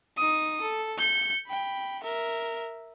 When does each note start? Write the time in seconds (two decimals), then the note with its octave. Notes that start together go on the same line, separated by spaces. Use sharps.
0.17 D#4 D#6
0.61 A4
0.98 G6 C#7
1.47 G5 B5
2.04 A#4 E5